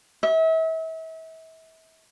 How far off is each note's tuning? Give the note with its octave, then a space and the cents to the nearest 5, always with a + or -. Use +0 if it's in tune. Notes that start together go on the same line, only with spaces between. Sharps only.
E5 -35